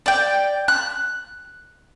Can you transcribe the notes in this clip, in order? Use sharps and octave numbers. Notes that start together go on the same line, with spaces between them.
D5 G5
F#6